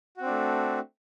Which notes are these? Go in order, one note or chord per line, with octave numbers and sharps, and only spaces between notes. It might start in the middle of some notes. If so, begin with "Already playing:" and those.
A3 C4 D4 F#4